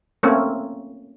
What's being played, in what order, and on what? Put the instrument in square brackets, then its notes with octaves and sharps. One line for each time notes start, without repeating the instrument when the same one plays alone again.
[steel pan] A3 A#3 C4 C#4